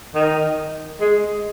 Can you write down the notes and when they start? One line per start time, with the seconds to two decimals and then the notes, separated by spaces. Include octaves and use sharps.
0.15 D#3
1.00 G#3